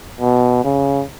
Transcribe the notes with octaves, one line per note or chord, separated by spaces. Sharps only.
B2
C#3